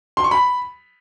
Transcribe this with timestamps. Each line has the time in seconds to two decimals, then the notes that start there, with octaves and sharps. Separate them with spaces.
0.17 C6
0.24 C#6
0.31 B5